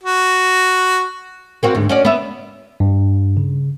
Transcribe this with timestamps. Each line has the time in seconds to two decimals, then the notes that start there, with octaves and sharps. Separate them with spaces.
0.04 F#4
1.63 A#3 C4 F#4
1.75 D2 G#2
1.89 C#4 F#4 D5
2.05 B3 E5
2.80 G2
3.37 C#3